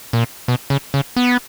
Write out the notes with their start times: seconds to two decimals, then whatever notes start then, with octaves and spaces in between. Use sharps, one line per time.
0.13 A#2
0.48 B2
0.70 C#3
0.94 C#3
1.16 B3